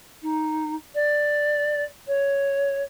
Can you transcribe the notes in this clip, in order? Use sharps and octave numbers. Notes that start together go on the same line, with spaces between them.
D#4
D5
C#5